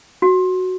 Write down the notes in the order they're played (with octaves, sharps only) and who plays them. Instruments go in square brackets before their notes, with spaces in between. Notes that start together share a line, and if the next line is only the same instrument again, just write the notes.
[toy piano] F#4